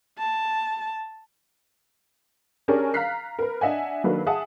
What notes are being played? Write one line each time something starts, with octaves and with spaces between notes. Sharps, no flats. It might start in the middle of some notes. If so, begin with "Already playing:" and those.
A5
C#4 D4 G4 G#4 A#4 C#5
F5 A#5 F6 F#6 B6 C7
A#4 B4
D4 D#5 E5 F#5 G#5
D#3 F#3 A#3 D4 A4 B4
G#4 E5 F#5 A5 D#6